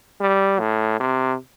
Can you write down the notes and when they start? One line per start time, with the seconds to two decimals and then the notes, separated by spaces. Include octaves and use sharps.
0.21 G3
0.60 A2
1.00 C3